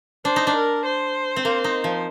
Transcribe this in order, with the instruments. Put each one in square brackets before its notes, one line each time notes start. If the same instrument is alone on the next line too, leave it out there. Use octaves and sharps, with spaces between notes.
[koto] D4 [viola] C5
[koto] D#4
D4
[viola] A#4
C5
[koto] C4
A#3
D#4
F3